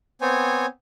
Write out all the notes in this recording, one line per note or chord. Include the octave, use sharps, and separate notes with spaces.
B3 C4 C5 C#5 G#5